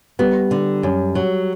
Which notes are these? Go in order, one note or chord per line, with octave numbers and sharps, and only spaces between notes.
G3 B3
D3
F#2
F#3